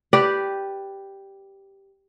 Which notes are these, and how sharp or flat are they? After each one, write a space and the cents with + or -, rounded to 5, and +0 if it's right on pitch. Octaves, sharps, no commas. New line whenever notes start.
G4 +0 B4 +0 D5 +5